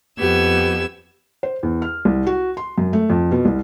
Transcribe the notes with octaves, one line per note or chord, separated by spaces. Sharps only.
F2 B3 G4 E6 G#6
C5
E2
F6
C2
F#4
C6
F#2
A3
F2
B2
C2